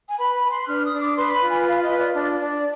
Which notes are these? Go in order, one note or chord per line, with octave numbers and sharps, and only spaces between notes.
G#5
B4 B5
B5
B4
C6
D4 F6
D#6
D4
D6
B4 C6
B5
F4
G#5
B4 F5
D#5
F4
D5
D4 D5
D4